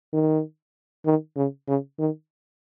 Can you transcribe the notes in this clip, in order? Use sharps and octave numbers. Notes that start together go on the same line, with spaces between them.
D#3
D#3
C#3
C#3
D#3